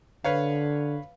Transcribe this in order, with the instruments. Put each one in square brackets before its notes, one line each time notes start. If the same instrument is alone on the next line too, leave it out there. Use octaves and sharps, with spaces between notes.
[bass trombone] D3 [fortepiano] B4 C#5 F5